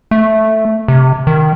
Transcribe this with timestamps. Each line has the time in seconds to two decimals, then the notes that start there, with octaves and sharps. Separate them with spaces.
0.11 A3
0.88 C3
1.27 D#3